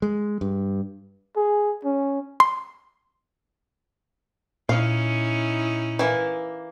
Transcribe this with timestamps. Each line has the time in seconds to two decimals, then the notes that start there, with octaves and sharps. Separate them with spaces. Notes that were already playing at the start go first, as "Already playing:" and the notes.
0.02 G#3
0.41 G2
1.36 G#4
1.84 C#4
2.40 C6
4.69 A#2 C#4 D#4 E4 F5
5.99 E3 A#3